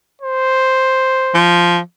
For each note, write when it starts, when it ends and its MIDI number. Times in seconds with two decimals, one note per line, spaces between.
0.22 1.53 72
1.34 1.79 53